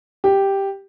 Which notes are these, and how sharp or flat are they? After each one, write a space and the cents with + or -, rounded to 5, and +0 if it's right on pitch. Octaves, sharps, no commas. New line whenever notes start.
G4 +0